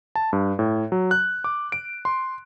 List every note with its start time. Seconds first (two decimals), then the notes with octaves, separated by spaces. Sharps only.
0.15 A5
0.33 G2
0.59 A2
0.92 F#3
1.11 F#6
1.44 D6
1.72 D7
2.05 C6